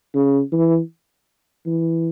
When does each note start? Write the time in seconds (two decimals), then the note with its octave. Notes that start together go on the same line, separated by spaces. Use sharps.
0.15 C#3
0.52 E3
1.66 E3